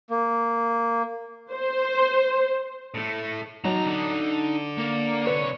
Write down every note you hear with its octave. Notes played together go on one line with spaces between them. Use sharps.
A#3
C5
A2 A3
F#3 D#4 A5 A#5
D3
A#3
C2 B4 C#5